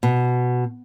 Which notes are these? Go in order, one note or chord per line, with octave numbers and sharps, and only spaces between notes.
B2